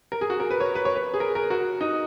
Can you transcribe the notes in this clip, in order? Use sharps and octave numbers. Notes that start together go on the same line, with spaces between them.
A#4
G#4
F#4
A#4
B4
C#5
B4
C#5
B4
G#4
A#4
A#4
F#4
D#4